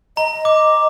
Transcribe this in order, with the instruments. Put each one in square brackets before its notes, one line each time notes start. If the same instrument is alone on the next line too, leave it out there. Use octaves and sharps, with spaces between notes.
[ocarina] D#5 [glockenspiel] A#5
[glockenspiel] D6